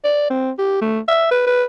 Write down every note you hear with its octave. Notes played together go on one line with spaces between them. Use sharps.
D5
C4
G4
A3
E5
B4
B4